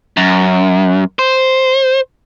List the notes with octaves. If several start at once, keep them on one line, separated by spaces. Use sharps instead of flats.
F#2
C5